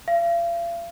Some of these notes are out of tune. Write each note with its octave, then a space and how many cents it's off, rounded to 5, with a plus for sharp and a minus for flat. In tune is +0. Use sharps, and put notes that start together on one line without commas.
F5 -40